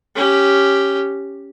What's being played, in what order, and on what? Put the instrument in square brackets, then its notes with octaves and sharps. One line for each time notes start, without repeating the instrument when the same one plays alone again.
[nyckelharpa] C#4 G4